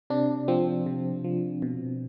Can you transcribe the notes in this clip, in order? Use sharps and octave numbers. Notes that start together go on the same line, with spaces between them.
C3 D4
F3 C4
C3
F3
B2